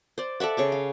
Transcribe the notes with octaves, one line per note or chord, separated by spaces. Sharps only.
C5 D5
A4 D5 E5 F#5
C#3 C#6 D6
F5